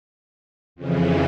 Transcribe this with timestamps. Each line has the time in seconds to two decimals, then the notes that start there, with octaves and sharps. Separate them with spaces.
0.76 F2 C#3 E3